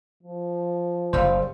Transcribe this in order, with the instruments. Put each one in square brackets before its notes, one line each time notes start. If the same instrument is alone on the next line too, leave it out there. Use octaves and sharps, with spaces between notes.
[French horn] F3
[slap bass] F#1 [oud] C#3 G3 F5 [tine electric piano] C5